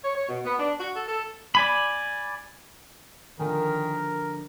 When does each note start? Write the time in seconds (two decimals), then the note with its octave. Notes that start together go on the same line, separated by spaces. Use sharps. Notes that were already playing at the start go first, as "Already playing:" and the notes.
0.04 C#5
0.16 C#5
0.29 B2
0.45 B3
0.59 D4
0.80 F#4
0.96 A4
1.08 A4
1.55 D5 G#5 B5
3.39 D3 D#3 F3 A#4 G#5